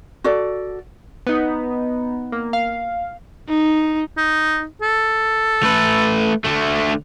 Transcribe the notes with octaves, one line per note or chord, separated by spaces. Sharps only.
F#4 A4 D5
B3 D#4
A#3
F5
D#4
D#4
A4
A3 B4
D3 A3